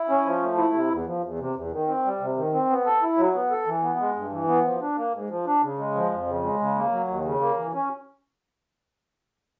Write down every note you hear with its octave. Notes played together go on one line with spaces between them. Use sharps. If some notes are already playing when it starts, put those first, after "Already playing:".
Already playing: E4
C#4
F3
A3
E4
C3
E2
F3
E2
C3
E2
D#3
C4
G3
C3
D#3
C4
B3
A4
E4
F#3
B3
A4
E3
B3
G#3
G2
E3
B3
F3
D4
A#3
G#2
F3
D4
C#3
G#3
F3
F2
C#3
G#3
C#3
A#3
F#3
D#2
C#3
A#3
E3
C#4